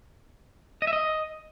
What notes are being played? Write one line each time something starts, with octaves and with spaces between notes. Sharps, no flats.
D#5
E5
D#5